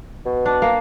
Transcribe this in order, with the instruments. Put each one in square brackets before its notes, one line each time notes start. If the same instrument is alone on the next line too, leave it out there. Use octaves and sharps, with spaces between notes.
[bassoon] B2
[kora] D4
A#3